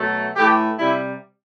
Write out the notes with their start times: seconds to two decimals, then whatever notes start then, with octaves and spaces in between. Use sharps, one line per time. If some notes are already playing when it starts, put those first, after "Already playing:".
Already playing: B2 F#3 A3
0.35 A2 E3 A3 G4
0.79 C3 G3 E4